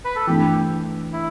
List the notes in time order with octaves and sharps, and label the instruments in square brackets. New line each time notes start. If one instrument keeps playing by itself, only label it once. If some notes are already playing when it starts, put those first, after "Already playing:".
[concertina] B4
A4
[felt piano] E3 A3 D4 [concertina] G4
[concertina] E4